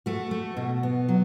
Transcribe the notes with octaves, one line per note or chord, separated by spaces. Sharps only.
A3 F#4
A3
B2
B3
F#3